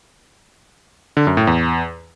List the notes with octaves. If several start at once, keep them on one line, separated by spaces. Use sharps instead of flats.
D3
F#2
A2
E2